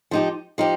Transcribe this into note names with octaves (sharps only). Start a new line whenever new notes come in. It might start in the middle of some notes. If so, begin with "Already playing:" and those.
F3 D#4 G4
F3 D#4 G4